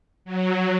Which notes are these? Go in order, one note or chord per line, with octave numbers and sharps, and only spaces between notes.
F#3